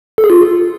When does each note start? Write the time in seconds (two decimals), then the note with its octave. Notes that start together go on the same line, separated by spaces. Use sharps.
0.18 A4
0.24 G#4
0.30 F4